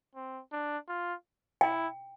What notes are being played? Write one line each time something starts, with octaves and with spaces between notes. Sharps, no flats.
C4
D4
F4
E4 G5